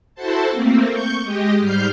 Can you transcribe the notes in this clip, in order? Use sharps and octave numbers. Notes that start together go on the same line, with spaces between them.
E4 F#4 A4 C5 A5
A3 A#3 C4
C#6 G6
G#3 G4 D#5
G#2 G3 F6 G6 C7